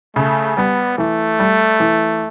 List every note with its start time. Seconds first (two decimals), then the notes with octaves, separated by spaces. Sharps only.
0.16 C#3 A3
0.57 G3 B3
0.98 E3 A3
1.39 G3
1.80 E3